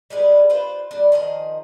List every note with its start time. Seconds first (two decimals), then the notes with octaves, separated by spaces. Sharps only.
0.10 G3 G#3 G#4 B4
0.49 D4 F4 B4 C5
0.91 G3 D4
1.12 D#3 F3 G#4 D#5